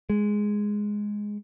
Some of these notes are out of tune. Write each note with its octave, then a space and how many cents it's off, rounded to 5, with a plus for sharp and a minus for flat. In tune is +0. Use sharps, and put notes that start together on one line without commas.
G#3 +0